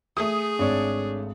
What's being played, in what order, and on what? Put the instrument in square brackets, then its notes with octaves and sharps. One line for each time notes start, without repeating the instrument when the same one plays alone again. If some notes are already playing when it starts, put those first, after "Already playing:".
[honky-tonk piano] A3 D#6 [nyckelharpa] G#4
[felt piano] G#1 [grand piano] D4 C#5 D5